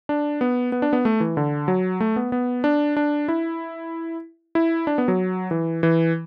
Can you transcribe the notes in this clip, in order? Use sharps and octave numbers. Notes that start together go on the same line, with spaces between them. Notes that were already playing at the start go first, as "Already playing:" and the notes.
D4
B3
B3
D4
B3
A3
E3
D3
F#3
A3
B3
B3
D4
D4
E4
E4
D4
B3
F#3
E3
E3